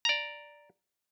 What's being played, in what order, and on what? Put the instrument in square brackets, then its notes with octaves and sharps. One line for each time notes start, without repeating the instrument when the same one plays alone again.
[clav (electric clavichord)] D5 A#5